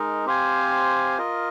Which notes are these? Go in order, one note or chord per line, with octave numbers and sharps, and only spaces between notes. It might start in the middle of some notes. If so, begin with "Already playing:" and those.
Already playing: G#3 D#4 A#4
C4 G4 C5 F5 G#5
F4 A#4 D#5